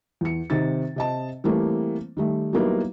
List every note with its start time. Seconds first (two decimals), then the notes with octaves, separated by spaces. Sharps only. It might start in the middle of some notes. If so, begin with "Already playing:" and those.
0.21 E2 C#7
0.50 C3 D#3 D#4 A6
0.96 C3 D#5 A5
1.44 E3 G3 A3 A#3 C4
2.17 D#3 G3 A3
2.53 F#3 G3 A#3 B3 D#4 E4